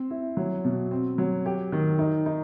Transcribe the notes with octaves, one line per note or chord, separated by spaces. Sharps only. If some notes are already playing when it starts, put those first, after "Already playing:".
Already playing: C4
E4
F#3
B2
C4
F#3
G4
D#3
D#4
D#4